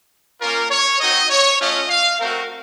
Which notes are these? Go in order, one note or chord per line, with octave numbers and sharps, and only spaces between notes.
A#3 C#4 F4 A#4
C#5
C4 D#4 F#4 D#5
C#5
A3 C#4 F4 D#5
F5
A3 C4 F#4 A#4